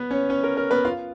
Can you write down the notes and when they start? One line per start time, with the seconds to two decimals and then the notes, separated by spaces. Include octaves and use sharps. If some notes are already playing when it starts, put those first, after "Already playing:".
Already playing: B3 B4
0.11 C#4 C#5
0.30 C#4 C#5
0.43 A#4
0.57 A#4
0.71 B3 B4
0.85 F4 F5